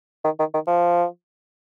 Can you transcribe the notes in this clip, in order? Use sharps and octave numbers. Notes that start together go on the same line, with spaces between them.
D#3
D#3
D#3
F3